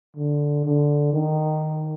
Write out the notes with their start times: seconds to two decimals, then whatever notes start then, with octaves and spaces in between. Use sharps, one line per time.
0.16 D3
0.65 D3
1.13 D#3